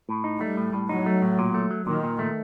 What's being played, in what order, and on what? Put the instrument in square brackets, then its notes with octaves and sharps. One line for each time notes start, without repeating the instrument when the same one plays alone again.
[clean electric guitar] A2
D#4
[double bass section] G3 [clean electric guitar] A3
[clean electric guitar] A2
A2
[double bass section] F#3 [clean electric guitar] D#4
[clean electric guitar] A3
A2
A#2
A3
F#3
[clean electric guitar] A#2 [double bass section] D#3
[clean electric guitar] A#2
A3